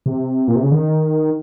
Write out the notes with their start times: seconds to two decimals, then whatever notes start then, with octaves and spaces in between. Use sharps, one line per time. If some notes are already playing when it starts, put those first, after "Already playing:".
0.06 C3
0.48 A#2
0.56 C3
0.63 C#3
0.72 D#3